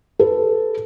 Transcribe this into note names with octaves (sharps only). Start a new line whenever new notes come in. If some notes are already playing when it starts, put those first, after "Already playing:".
A4 B4